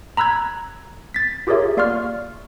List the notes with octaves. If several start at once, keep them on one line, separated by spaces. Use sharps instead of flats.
A#5 B5 E6 F#6 G#6
A6 B6
F4 G4 G#4 A#4 C#5 E5
A#3 D5 F5 C6 C#6 F6